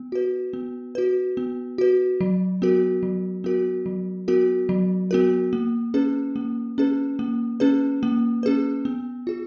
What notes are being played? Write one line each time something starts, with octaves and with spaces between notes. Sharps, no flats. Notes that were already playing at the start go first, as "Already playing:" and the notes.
Already playing: B3
F#4 B4
B3
F#4 B4
B3
F#4 B4
F#3
B3 F#4 A#4
F#3
B3 F#4 A#4
F#3
B3 F#4 A#4
F#3
B3 F#4 A#4
A#3
C#4 G#4 B4
A#3
C#4 G#4 B4
A#3
C#4 G#4 B4
A#3
C#4 G#4 B4
B3
F4 G#4